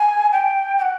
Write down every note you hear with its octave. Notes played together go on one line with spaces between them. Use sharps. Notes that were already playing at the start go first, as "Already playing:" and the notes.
Already playing: G#5
G5
G5
F#5